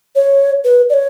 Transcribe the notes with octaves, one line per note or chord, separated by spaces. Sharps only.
C#5
B4
D5
C#5